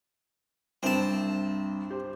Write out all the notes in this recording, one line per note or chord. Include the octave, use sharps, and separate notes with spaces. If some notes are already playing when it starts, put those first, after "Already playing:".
C2 G2 C4 A5
G4 C5